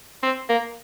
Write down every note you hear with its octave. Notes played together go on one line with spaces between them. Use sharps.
C4
A#3